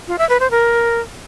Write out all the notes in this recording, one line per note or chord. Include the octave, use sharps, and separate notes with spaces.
F4
E5
B4
C5
A#4